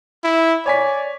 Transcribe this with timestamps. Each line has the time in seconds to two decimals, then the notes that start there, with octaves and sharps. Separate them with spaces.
0.24 E4
0.66 C#5 D5 G#5 B6